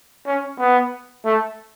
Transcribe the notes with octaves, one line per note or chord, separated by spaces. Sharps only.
C#4
B3
A3